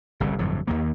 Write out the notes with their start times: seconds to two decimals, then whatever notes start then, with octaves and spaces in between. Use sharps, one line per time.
0.20 G1 C2 C#3
0.39 G1 F2 A2 F#3
0.67 D#2 D#3 A#3